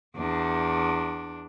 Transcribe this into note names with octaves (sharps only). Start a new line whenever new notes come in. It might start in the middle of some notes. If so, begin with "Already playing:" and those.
E2 D4